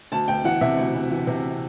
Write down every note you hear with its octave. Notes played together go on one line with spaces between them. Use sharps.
D2 A5
D2 G5
E3 F#5
C3 E5
D2
D2
E3
C3